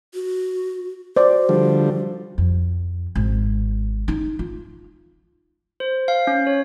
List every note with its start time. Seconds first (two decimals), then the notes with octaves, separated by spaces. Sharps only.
0.14 F#4
1.16 F#4 C5 D5
1.49 D3 F3 G3
2.38 F2
3.15 G#1
4.08 D#4
4.39 F4
5.80 C5
6.08 F5
6.27 C#4
6.47 C#5